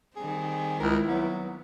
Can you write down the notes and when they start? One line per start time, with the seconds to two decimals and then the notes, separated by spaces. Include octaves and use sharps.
0.16 D#3 G3 C4 G#4
0.80 C#2 E4 A#4
1.08 F#3 B3